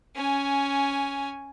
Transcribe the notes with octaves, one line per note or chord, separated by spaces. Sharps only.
C#4 G#5